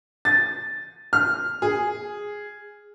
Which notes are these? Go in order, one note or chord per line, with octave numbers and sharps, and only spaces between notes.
A6
F6
G#4